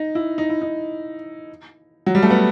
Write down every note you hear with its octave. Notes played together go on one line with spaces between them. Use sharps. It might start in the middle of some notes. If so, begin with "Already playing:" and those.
Already playing: D#4
E4
D#4
E4
D#4
F#3
G3
A3
B3